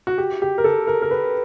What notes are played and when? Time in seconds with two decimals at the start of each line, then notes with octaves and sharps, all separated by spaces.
0.07 F#4
0.18 G4
0.42 G4
0.58 A#4
0.64 A4
0.87 A#4
1.02 A#4
1.11 B4